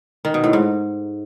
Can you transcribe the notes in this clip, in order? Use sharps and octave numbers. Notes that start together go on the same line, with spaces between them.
D#3
B2
A2
G#2